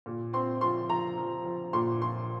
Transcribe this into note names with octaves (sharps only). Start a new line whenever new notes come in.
A#2
C4 C6
F3 C6
F3 A#5
F3
F3
A#2 C6
F3 C6